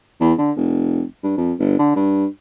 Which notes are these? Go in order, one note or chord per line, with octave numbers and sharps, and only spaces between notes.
E2
D3
F1
G2
F2
G1
D3
G2